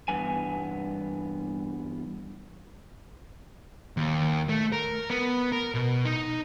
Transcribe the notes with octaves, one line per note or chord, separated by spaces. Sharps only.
E2 G2 B3 G#5
D#2
A3
A#4
B3
A#4
B2
D#4